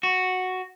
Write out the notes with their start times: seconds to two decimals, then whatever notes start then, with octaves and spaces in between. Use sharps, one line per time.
0.03 F#4